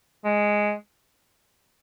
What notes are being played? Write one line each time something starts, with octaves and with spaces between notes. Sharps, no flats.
G#3